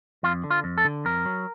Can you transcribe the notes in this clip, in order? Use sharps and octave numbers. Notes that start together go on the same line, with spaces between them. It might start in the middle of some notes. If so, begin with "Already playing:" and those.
F2 F4
D3
F4
F2
A4
D3
F2 A#4
F#3